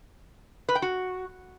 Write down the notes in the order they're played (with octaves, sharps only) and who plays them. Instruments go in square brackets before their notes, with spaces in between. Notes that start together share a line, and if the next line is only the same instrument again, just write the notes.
[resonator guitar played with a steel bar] B4
G5
F#4